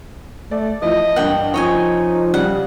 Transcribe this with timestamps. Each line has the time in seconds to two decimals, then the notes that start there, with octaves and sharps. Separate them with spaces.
0.51 A3 D5
0.82 F3 E4 D#5
1.16 G2 A#3 F#5 G5
1.54 F3 C#4 D#4 C#5 D#5 G#5
2.34 C#3 G3 F#5